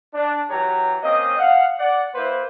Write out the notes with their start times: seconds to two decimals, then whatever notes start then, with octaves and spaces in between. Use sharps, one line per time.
0.14 D4
0.50 E3 F#3 G4 C#5 A#5
1.02 A#3 C4 C#4 D#5
1.39 F5 F#5
1.78 D5 F#5
2.15 A#3 E4 B4 C5